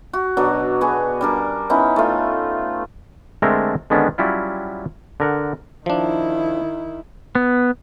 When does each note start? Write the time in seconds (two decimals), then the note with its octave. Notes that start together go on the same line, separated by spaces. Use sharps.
0.13 F#4
0.37 B2 F#3 D4
0.81 B3 F#4 G#4
1.21 G3 D4 A#4
1.70 B3 C#4 D#4 E4
1.96 A3 F4
3.42 D3 G#3 A3 C4 A4 A#4
3.90 D3 D#3 G#3 B3 C#4 D4
4.18 F#3 G3 C#4 E4 F4
5.20 D3 A#4 F#5
5.86 D#3 F3 D4 E4
7.35 B3